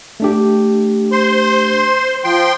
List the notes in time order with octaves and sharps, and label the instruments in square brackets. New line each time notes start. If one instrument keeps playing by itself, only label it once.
[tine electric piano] A3 D4 G4
[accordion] C5 C6
F3 G5 C6